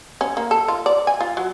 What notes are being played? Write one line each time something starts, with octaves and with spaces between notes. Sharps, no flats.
C#4
A#3
A4
F4
D5
G#5
F4
F#3